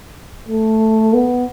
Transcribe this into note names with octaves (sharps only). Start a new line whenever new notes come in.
A3
B3